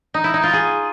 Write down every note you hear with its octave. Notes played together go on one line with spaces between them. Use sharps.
D#4
E4
D#4
F4
G#4